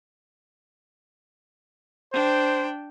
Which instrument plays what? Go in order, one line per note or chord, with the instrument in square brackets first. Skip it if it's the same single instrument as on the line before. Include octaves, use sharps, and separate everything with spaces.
[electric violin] D4 G5 [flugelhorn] C5